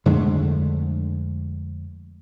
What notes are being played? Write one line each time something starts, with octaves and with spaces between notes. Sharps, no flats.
F2 D3 G#3 A3